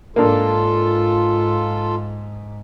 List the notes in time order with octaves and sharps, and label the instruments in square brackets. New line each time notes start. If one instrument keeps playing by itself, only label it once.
[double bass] G#2 [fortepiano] A#3 D4 [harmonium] F4 A4